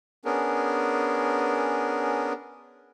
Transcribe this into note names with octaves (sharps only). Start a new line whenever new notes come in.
B3 C#4 D4 G#4 A#4